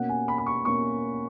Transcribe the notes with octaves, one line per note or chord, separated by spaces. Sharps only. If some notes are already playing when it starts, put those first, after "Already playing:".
Already playing: B2 A#3 C#4 F#5
G#5
B5
B5
C#6
B2 A#3 C#4 C#6